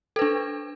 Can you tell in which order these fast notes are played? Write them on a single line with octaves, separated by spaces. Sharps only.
A4 B4 D4